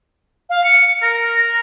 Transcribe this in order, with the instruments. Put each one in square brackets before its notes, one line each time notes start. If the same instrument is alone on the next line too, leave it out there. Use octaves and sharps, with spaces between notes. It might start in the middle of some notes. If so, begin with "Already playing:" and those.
[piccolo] F5
C#7
[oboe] A#4 [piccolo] A#6